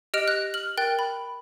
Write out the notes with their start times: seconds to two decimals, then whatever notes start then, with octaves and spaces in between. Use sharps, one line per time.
0.14 G4 D#5 F6 F#6 D7 F7
0.28 F#6 A#6
0.54 F6 F#7
0.77 A#4 G5 F#6 A6
0.99 B5